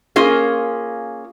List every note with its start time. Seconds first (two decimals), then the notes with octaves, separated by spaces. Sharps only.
0.16 A#3 C#4 F4 G#4